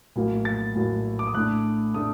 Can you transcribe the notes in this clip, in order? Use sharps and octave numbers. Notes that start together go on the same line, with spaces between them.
A#1 A2 F#3 A#3
A6
A#1 A2 F#3 A#3
D6
D#6
A2 A3 D4 F#6
A2 A3 D4 D#6